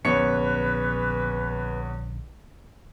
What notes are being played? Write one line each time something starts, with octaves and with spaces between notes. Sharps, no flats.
A#1 E2 D3 C#4 B4 C#5 C#7